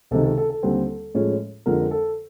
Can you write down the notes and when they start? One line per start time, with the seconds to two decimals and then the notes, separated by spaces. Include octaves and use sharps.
0.11 C#2 C3 D#3 A4
0.24 A4
0.38 A4
0.50 A4
0.63 D#2 D3 G3 C4
1.14 A2 F3 G#3 C#4
1.66 F2 D3 F3 G#3 A#4
1.91 A4